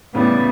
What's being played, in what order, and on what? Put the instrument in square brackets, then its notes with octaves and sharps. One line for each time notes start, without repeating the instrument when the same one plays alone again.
[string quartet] A2 G3 B3 [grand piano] C#3 E3